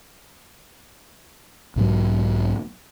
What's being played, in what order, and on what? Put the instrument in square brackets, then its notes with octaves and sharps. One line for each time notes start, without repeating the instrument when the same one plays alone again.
[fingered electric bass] B1 G#2 B2 F#3